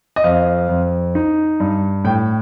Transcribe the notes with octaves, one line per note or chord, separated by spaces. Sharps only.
D#5
F2 F5
F2
D#4
G2
A2 G5